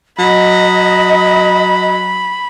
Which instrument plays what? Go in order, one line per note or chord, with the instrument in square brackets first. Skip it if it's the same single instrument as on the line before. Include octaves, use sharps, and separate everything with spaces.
[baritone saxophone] F#3 [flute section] D#5 [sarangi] B5